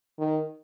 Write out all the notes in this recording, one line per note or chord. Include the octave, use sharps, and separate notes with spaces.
D#3